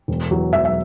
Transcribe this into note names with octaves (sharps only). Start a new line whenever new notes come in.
E1
E2 B2 F#3
E1 E5
E5